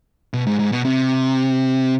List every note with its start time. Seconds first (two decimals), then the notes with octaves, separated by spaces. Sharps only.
0.33 B2
0.47 G#2
0.60 G#2
0.72 B2
0.85 C3